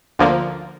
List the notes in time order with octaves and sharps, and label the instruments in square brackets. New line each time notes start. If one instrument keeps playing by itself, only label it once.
[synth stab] D2 D3 F3 A#3